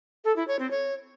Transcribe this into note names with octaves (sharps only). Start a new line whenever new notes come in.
A4
E4
C#5
C4
C#5